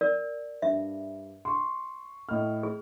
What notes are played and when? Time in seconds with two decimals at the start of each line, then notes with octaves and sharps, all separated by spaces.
0.01 A#4 D5
0.62 G2 E5
1.45 C6 C#6
2.29 A2 D#5 F6
2.63 G#4